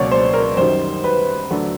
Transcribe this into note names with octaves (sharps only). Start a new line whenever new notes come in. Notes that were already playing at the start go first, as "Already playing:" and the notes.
Already playing: C#2 B2 F#3 A#3 C#4 C#5 D5
C5
A#4
F#2 D#3 G3 C5
B4
D2 D3 F#3 A3 D4